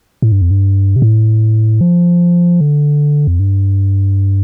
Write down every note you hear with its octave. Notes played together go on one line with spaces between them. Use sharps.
A2
G2
F2
G2
C3
A2
F3
D3
F2
G2